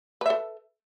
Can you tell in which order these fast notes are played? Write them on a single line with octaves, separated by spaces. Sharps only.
B4 E5 A4